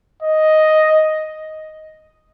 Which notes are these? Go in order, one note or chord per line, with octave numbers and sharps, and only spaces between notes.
D#5